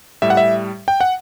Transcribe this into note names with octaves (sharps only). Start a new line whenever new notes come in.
A2 G3 E5
F#5
E5
G5
F#5